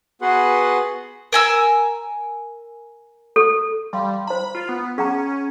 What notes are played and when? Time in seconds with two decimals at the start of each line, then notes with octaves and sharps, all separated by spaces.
0.22 B3 F#4 G#4 B4 F#5 C6
1.32 A#4 G#5 E6
3.36 A4
3.93 G3 F5 C6
4.27 C5 A#5 B5
4.55 F4
4.69 B3
4.98 C#4 G#4 F#5 A#5